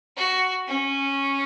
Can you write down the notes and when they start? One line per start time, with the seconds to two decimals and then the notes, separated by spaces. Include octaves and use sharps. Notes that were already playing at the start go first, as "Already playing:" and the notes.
0.17 F#4
0.67 C#4